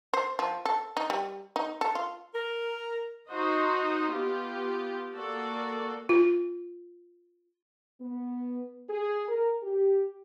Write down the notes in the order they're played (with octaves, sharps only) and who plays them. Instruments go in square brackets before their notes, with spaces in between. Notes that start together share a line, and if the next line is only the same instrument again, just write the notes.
[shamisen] C5
F3
A4
D#4
G3
D#4
A4
F4
[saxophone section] A#4
[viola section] D#4 F#4 C5 D#5
B3 F4 G4
A#3 F#4 A4 D5
[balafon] F4
[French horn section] B3
G#4
A#4
G4